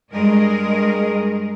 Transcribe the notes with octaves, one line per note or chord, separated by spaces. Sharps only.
G2 G#3 G#4 A#4 D#5